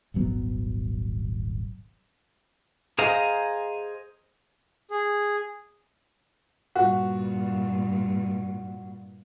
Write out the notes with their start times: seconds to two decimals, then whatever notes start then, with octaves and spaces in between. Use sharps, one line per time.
0.14 D#1 G#1 F#3 B3
2.99 G#4 C5 D#5 F5 A#5
4.91 G#4
6.75 G2 A#2 F#4